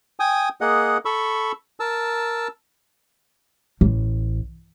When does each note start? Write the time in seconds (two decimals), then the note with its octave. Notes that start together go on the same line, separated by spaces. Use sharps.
0.20 G5 G#5 D#6
0.61 A#3 G#4 D#5 F#5
1.05 A4 B5 C#6 E6
1.80 A#4 A5 E6
3.81 A1